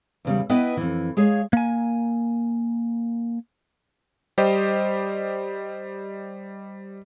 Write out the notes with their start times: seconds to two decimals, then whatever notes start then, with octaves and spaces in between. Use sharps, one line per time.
0.25 E2 C#3 G3
0.50 B3 E4 B4 D#5 E5 G5
0.77 F2 E3
1.17 G#3 G#4 C#5 F5
1.53 A#3 G#5
4.38 G3 G4 C5 D#5